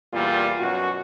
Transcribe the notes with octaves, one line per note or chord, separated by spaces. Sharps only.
E2 A#2 G3 F4
F#2 B2 F#4